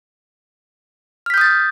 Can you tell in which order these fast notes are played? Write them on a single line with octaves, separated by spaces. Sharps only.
F6 B6 G6 D#6 A6